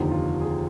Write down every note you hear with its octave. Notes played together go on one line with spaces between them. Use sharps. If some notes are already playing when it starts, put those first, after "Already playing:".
Already playing: F1 D#2 D3 F3 D#4
F4
G#4